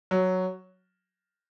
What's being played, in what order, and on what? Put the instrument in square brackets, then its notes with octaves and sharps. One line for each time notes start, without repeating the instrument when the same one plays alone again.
[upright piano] F#3